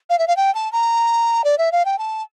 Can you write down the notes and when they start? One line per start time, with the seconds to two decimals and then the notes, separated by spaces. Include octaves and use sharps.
0.10 F5
0.19 E5
0.28 F5
0.37 G5
0.55 A5
0.72 A#5
1.44 D5
1.58 E5
1.72 F5
1.85 G5
1.98 A5